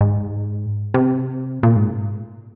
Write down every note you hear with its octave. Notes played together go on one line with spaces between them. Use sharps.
G#2
C3
A#2
G#2